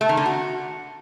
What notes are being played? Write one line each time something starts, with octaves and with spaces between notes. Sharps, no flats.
A3
D#3
D3
F#4